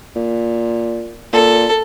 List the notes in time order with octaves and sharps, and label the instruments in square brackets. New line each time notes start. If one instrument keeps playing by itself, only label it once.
[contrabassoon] A#2
[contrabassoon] A#2 [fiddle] A4